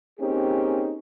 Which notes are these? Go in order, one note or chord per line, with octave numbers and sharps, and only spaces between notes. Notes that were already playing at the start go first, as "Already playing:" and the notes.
A#3 C4 C#4 D#4 G4 G#4